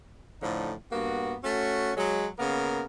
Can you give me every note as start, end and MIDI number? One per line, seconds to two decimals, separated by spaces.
0.42 0.73 45
0.42 0.73 50
0.42 0.73 53
0.42 0.73 63
0.91 1.35 43
0.91 1.35 58
0.91 1.35 59
0.91 1.35 66
1.43 1.92 57
1.43 1.92 61
1.43 1.92 66
1.96 2.27 54
1.96 2.27 56
2.39 2.84 49
2.39 2.84 58
2.39 2.84 59
2.39 2.84 70